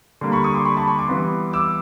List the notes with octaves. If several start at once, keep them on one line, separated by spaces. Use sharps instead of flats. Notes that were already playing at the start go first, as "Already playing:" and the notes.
D3 G3 A#3
B5 C#6
C#6 D#6
C6 D6
B5 C#6
A5 B5
B5 C#6
C6 D6
E3 G3 B3
D6 E6